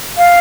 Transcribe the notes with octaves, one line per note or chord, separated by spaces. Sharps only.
F5